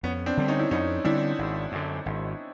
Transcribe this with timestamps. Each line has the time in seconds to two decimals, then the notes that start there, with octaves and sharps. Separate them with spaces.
0.03 F2 B3 C#4
0.26 C4 D4
0.37 D3 G3 C4
0.48 C#4 D#4
0.59 E4
0.71 F2 C#4 D#4
1.04 D3 G3 C4 D4 E4
1.38 G#1
1.72 F#2 D3
2.06 G#1